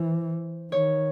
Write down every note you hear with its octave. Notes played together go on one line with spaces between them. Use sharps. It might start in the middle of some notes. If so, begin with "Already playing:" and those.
Already playing: E3 C5
D#3 C#5